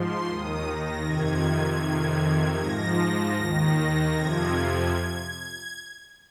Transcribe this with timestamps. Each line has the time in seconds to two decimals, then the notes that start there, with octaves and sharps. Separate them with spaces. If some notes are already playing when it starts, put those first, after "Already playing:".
Already playing: G#2 F3 C6
0.27 D#2 D#3 D#6
0.66 A#6
1.04 F2 C3 D#3 G#6
1.81 F2 C3 D#3
2.59 G#2 F3 A#6
3.36 D#2 D#3
4.13 F2 C3 F3 G#6